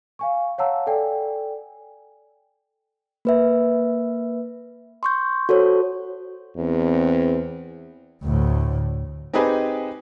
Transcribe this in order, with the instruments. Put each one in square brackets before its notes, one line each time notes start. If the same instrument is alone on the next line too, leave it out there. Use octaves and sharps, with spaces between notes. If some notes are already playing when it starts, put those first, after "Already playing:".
[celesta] F5 G#5 C#6
C#5 F5 F#5 A5 A#5 E6
A4 D5 G5 G#5
[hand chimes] A#3 B4 E5
C6 C#6 G6
F#4 A4 C5 C#5
[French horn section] E2 C4
[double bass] D2 A2
[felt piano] C4 D#4 G4 G#4 B4 G#5